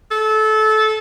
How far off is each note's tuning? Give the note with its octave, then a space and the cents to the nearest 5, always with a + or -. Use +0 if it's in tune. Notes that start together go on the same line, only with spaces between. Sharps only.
A4 -20